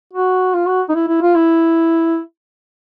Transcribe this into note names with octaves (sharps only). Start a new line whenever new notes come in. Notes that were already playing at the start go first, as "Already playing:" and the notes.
F#4
F4
F#4
D#4
E4
E4
F4
E4